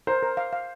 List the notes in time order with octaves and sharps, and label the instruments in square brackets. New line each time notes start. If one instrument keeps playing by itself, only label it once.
[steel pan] A#4 [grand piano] C5
[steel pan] A#4
F5
F5